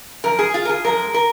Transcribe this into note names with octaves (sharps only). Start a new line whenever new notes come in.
F#2 F3 A#4
G#4
F4
A#4
G#4
F#2 F3 G#3 A#4
A#4